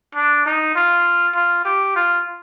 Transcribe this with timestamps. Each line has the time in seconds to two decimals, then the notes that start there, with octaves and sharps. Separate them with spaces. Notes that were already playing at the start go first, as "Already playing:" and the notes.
0.15 D4
0.46 D#4
0.75 F4
1.35 F4
1.65 G4
1.96 F4